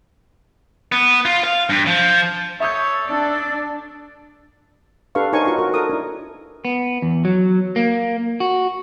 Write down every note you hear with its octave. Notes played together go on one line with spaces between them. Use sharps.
B3
F4
F5
G2
F3
A4 C#5 E5 D#6 G6
D4 D5
D4 G4 A4 B4 F5 C#6
D#4 A#4 C5 C#5 G#5 C#6
F4 F#4 B4 C#6
F#4 A#4
A4 A#4 D#6
D4 E4
B3
E2
F#3
A#3
F#4